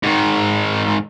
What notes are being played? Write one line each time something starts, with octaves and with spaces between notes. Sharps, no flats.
G#2 D#3